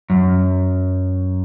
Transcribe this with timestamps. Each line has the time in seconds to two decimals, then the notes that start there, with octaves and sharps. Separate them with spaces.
0.10 F#2